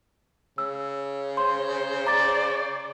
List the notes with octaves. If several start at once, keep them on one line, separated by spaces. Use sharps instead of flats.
C#3 E6
C5 C6
D5 A#5 D6 A6